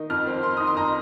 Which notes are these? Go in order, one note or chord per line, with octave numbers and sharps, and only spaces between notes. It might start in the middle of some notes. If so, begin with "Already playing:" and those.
Already playing: D#3 D#4
F2 F6
C4
D#3 C6
D#4 D#6
C6
F2 A#5